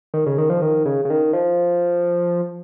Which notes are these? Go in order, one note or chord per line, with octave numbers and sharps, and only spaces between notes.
D#3
C#3
D#3
F3
D#3
C#3
C#3
D#3
F3